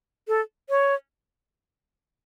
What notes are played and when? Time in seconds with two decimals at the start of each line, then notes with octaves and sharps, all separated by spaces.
0.28 A4
0.70 C#5